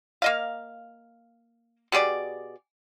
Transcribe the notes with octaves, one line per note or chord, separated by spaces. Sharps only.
A#3 D#5 F5
B2 G4 G#4 D5